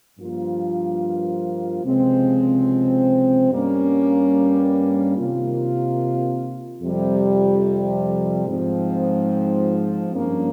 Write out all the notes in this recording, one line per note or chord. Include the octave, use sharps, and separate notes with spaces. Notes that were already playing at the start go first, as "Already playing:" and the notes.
G2 F3 A#3 F4
C#2 C3 F3 G#3 C4
G2 G3 A#3 C#4
C3 D#3 A#3 F4
F2 C3 G3
G#2 F3 C4
G2 F3 A#3 C#4